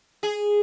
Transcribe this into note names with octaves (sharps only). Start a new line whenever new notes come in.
G#4